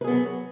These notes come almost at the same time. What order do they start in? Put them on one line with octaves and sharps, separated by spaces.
B4 G#4 B3 F#3